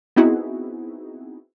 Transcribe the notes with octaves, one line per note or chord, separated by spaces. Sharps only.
B3 C4 D#4 E4 F#4 G#4